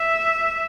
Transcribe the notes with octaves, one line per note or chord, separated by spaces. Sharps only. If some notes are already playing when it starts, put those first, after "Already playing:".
Already playing: E5